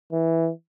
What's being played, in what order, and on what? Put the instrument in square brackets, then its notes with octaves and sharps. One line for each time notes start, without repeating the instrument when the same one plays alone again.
[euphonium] E3